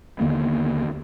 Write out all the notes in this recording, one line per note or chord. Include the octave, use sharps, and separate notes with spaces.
D#2 D3 A#3 B3